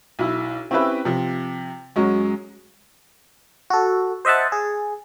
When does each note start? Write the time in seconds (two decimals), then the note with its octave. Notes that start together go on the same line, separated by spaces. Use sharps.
0.19 B1 E4
0.71 C4 C#4 E4 G4 B4 E5
1.05 C3 F3
1.96 F#2 F#3 G#3 C#4
3.70 F#4 A4
4.25 C5 D#5 E5 F#5 A5
4.52 G#4